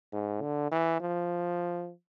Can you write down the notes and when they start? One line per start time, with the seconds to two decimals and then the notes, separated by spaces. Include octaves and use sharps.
0.12 G#2
0.42 D3
0.71 E3
1.00 F3